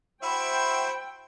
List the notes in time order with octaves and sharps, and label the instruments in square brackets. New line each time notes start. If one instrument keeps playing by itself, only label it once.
[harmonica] E4 F#4 E5 [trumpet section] C5 [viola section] G5 [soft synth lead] B5